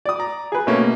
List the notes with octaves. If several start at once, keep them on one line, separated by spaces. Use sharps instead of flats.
D5 D#6
A#5
G#4 B4
B2 A3 A#3 C#4